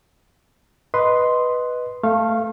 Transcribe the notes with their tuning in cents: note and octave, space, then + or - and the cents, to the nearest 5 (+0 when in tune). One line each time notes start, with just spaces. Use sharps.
B4 +0 D#5 +0 C6 +0
A3 +5 F5 -15 C#6 -35